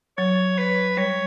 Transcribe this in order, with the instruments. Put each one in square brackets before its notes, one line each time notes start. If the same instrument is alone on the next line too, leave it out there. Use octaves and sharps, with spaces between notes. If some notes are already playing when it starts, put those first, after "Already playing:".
[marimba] F#3 [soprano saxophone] C#5
[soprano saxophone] B4
[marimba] G3 [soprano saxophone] C#5